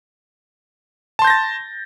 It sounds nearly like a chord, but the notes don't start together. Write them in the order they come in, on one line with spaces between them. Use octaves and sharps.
A5 C6 G6 A#6 A6